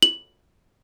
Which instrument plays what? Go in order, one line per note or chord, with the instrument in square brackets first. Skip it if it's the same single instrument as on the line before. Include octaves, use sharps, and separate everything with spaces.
[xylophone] F#7